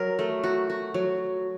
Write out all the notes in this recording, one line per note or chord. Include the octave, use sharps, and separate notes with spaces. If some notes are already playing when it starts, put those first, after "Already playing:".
Already playing: F#3 A#4
A3
F#4
F#4
F#3